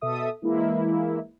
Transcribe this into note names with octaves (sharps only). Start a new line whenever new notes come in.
B2 A4 E5 D#6
E3 G#3 A#3 E4